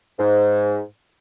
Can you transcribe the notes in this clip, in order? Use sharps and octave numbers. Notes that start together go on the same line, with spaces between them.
G#2